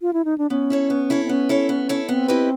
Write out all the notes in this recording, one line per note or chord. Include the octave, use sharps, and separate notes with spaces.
F4
E4
D#4
D4
B3 C#4
E4 A4 C#5
B3
E4 A4 C#5
C4
B3 C#4
E4 A4 C#5
B3
E4 A4 C#5
B3 C4
E4 G4 B4 D#5